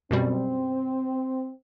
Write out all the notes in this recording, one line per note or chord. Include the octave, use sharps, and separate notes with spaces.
F#2 B2 G3 C4